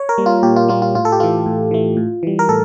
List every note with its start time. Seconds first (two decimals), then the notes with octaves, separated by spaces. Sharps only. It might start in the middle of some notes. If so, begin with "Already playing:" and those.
Already playing: C#5
0.09 A#4
0.18 G3 A#3
0.26 F4
0.43 A#2 G4
0.56 F4
0.68 G3 A#3 F4
0.82 F4
0.95 A2 F4
1.05 A4
1.12 G4
1.20 E3 A3 F4
1.46 A2
1.71 E3 A3
1.97 A2
2.23 E3 G3
2.39 A#4
2.49 A2 A4